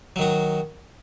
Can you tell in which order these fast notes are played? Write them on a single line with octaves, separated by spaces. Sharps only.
F#3 D#3 F#4